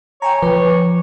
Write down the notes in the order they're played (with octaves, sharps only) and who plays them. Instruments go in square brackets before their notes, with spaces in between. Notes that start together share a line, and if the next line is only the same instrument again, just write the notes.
[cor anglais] C#5 [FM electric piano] G5 G#5 A#5
[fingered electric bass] F3 [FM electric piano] B4 D6